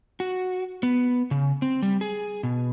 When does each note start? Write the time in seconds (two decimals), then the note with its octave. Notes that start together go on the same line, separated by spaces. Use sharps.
0.20 F#4
0.83 B3
1.31 C#3
1.62 C4
1.82 G3
2.01 G#4
2.43 B2